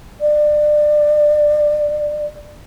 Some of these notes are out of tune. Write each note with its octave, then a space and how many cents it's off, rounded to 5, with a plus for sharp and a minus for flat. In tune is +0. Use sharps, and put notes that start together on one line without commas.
D5 +25